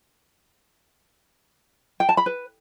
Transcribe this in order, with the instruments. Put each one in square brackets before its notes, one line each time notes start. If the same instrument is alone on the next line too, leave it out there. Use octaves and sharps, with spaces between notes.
[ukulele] G5
A5
B5
B4